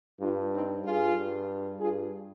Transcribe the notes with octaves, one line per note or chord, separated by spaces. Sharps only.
G2 D4 F4
C4 D#4
G2 F4 G#4
G2
G2 F4 G#4